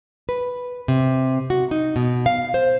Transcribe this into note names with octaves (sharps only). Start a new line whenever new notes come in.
B4
C3
F#4
D#4
B2
F5
C5